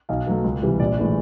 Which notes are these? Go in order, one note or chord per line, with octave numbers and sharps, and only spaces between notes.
B1 D#5 F5
B2 F#3 A3
C#2
C3 E3 G3
A#1 D5
A2 E3 G#3